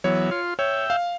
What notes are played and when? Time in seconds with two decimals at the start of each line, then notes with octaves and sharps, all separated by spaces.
0.04 E3 F#3 B3 C#5
0.31 F4 C6
0.59 C#5 E5 G5
0.90 F5